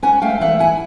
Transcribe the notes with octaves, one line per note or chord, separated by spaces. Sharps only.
C#4 F#5 G#5
A3 F5 G5
E3 E5 F#5
E4 F#5 G#5